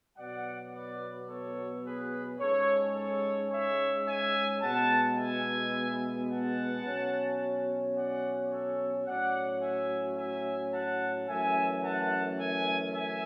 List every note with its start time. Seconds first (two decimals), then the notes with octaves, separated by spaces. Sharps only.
0.18 B2 F#3 B3 D5 F#5
0.73 B4 D5
1.29 A4 C#5
1.85 G#4 B4
2.40 G#2 G#3 C#4 A4 C#5
2.95 A4 C#5
3.51 C#5 E5
4.07 E5 G#5
4.62 B2 G#3 B3 F#5 A5
5.18 E5 G#5
6.29 F#5 A5
6.84 B2 F#3 C#4
7.95 D5 F#5
8.51 A4 C#5
9.06 A2 F#3 C#4 D5 F#5
9.62 E5 G#5
10.17 E5 G#5
10.72 F#5 A5
11.28 F#2 E3 A3 C#4 E5 G#5
11.83 F#5 A5
12.39 E5 G#5
12.94 E5 G#5